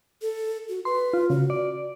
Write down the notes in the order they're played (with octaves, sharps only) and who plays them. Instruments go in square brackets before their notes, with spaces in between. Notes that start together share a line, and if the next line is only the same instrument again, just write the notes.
[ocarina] A4
F#4
[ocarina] B4 [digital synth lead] C6
[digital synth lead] F4
[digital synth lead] C#3 [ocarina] F#4
[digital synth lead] D5